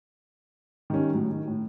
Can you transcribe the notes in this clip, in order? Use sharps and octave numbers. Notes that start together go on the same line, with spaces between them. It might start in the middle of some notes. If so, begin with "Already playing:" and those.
D#3 G3 C#4
A2 F#3
D#3
A2